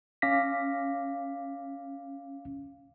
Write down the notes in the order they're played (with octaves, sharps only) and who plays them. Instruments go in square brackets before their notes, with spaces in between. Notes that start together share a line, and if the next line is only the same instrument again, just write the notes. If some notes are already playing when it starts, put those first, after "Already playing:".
[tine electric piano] C#4 F5 D6 A#6 B6